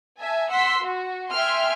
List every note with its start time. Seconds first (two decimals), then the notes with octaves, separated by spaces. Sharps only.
0.17 E5 G#5 A5
0.50 F#5 C6 E6 B6
0.80 F#4
1.30 E5 G5 G#5 C6 F6